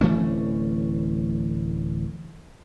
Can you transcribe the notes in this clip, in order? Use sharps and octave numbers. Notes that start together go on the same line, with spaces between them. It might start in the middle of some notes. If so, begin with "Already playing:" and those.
D1 E3 A3 C#4